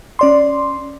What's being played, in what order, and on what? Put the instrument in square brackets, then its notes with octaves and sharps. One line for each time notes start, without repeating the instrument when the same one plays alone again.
[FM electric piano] C#4 D5 C6